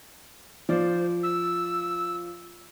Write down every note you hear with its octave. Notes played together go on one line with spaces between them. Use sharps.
F3 C5 D5
E6